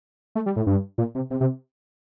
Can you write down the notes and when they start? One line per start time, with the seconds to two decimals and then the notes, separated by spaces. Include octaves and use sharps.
0.35 A3
0.46 G3
0.56 A2
0.67 G2
0.98 A#2
1.15 C3
1.31 C3
1.41 C3